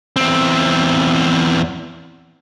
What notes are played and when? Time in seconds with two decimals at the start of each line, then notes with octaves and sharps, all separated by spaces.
0.16 E2 C4